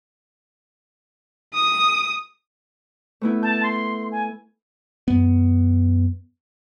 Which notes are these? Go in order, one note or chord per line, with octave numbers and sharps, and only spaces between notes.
D#6
A3 B3 E4
A5 G6
C6
G#5
F#2 B3